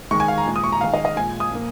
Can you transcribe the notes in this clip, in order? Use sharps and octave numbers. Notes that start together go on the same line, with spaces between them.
D#3 G#3 C#6
G#5
F5
A#5
A#2 G#3
D#6
C#6
A#5
D#3 G#3 F5
D#5
D#5
A#2 G#3 G#5
D#6
A#2 F3 A#3